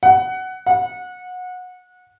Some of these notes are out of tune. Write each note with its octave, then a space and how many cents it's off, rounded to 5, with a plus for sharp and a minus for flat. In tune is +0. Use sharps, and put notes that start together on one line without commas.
F#5 +15
F#5 -25